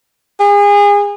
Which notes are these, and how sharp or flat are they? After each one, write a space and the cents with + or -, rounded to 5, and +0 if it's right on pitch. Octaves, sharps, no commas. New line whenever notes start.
G#4 -30